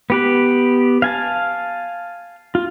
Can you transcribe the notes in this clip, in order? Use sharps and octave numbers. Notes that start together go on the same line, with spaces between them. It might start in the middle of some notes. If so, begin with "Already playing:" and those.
B3 G4 B4
F5 G#5 A5
F4